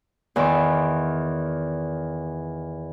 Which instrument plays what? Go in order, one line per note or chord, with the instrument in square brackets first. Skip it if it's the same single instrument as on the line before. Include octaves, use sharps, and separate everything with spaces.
[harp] E2 D#3 E5 C6 D6